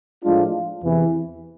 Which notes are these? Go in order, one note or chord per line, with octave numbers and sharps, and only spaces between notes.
A2 F3 G#3 D4 F4
E2 C3 E3